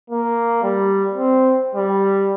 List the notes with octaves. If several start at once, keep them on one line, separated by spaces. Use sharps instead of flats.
A#3
G3
C4
G3